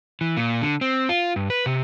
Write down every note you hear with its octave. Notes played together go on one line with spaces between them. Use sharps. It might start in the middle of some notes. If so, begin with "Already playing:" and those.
E3
A#2
D3
C4
F4
G2
B4
C3